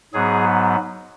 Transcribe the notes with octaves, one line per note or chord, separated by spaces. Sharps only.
G#2 F#3 B3 G#4